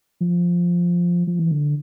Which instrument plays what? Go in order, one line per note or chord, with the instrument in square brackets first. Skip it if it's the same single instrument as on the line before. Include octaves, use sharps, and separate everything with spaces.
[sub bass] F3
F3
E3
D3